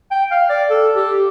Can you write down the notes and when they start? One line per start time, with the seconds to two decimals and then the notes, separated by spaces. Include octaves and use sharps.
0.11 G5
0.31 F5
0.49 D5
0.70 A4
0.95 G4